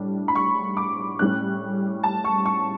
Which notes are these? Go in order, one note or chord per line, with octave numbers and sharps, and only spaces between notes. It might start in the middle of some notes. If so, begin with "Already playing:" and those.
Already playing: A2 G3 D4
B5
C#6
D6
A2 G3 C#4 F#6
A5
C#6
C#6